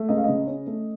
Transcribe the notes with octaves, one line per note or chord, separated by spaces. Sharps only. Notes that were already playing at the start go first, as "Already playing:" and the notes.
Already playing: A3
C#2 D#5
F5
C#3 D#5
C#4
A3